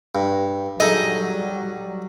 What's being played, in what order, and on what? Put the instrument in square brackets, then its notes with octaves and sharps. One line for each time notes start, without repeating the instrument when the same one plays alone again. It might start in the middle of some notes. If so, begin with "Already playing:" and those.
[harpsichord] G2
[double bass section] F#3 G3 [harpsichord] D#4 G#4 A4 [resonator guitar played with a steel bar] D#5